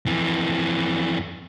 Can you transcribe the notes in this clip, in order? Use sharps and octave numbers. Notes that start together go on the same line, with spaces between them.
F2 E3